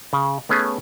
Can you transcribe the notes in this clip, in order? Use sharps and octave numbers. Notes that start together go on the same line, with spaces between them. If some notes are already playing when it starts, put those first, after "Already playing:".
C#3
A3 B3 C#4 G#4